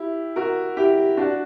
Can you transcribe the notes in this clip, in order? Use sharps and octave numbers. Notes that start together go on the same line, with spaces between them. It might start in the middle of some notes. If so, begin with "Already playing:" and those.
Already playing: E4 G4
F#4 A#4
E4 G4
D4 F#4